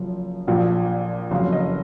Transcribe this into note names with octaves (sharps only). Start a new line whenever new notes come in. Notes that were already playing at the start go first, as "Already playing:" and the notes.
Already playing: F#1 F#2 F3
A#1 A#2 F3
F#1 F2 C#3 F#3 F5
D#5